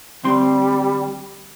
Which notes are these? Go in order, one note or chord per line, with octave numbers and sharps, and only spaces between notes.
D2 G3 C4 C6